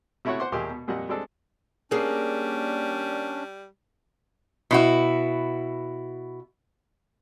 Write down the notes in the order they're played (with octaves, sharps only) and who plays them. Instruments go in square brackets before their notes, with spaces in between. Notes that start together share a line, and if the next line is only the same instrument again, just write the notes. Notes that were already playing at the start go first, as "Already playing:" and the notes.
[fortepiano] C3 A3 E4 F#4 C#5 F#5
C5 F#5 C6 D6
D#2 A#2 G#3 A#3 G4 C6
B2
F2 A#2 G3 D#5 F#5
G3 G#3 C4 D4 A4
[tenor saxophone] G3 [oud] A#3 G#4 [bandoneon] C#4 D4
[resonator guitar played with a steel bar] B2 E4 F#4